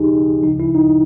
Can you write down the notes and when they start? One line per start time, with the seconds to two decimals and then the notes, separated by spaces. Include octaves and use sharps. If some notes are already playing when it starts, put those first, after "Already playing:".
Already playing: D#2 C#3 F3 D#4 G4 G#4
0.43 D2 C#3 F3 D#4
0.60 E4
0.75 D#4